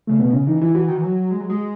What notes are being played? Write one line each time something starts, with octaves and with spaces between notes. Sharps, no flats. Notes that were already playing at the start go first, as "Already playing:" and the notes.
C#3 A3
B2 B3
C#3 C#4
E3 D#4
E3 E4
E3 F#4
D#3
E3
F#3
G#3
F#3
G#3